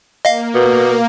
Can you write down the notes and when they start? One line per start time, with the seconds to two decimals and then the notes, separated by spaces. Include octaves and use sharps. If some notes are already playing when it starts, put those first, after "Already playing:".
0.25 A#3 D#5 F5
0.55 B2